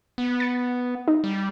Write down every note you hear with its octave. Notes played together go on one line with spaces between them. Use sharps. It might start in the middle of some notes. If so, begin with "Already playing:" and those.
B3
A6 C#7
D#4
G3